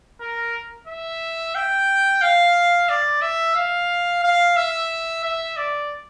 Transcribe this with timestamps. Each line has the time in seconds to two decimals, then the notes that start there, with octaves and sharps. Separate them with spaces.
0.21 A#4
0.87 E5
1.55 G5
2.22 F5
2.89 D5
3.21 E5
3.55 F5
4.23 F5
4.57 E5
5.24 E5
5.56 D5